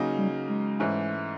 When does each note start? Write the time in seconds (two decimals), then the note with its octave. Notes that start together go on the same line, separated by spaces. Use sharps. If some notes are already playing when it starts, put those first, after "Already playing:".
Already playing: C#3 F#3 A#3 D#4
0.18 G3
0.49 G#3
0.80 G#2 E3 A3 C#4 E4